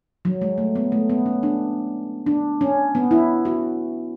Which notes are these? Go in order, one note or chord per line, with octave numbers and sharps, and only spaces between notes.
F#3
G#3
A3
B3
A3
B3
C#4
D4
D4
C#4
B3
E4
F#4